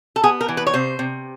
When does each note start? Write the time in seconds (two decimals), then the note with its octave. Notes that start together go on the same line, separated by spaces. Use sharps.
0.16 A4
0.23 B3 G#4
0.41 A#4
0.49 E3
0.57 B4
0.67 C#5
0.74 C3 C5
0.99 C3